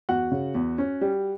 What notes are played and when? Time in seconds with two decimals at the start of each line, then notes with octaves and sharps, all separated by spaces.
0.09 E2 F#4 F#5
0.32 C#3
0.55 E2
0.78 C#4
1.01 G3